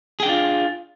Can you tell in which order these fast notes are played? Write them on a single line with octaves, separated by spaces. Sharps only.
G#4 G5 D4 F4